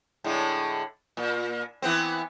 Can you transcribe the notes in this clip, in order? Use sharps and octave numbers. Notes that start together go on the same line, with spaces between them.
A2 D3 G#3
A#2
E3 B3 C4